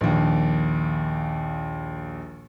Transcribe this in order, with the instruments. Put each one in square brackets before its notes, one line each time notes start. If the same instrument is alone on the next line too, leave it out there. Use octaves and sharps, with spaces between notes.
[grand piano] A#1 D#2